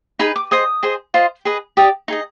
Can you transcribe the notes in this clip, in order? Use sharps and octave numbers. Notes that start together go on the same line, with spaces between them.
D#4 G#4 B4 B5
D6
G#4 C5 D#5 D#6
G#4 C5 D#5
F4 C5 D#5
G#4 B4 D#5
G4 D5 D#6
D#4 G#4 D#5